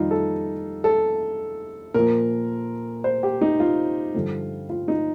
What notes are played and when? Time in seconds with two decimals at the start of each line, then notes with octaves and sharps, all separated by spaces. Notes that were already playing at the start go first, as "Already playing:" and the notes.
Already playing: F2 D#3 G3 D#4 F4
0.11 A4
0.84 A4
1.94 A#2 F3 A#4
3.04 C5
3.23 G4
3.41 D#4
3.60 F4
4.14 G2 D3 F3
4.69 F4
4.88 D#4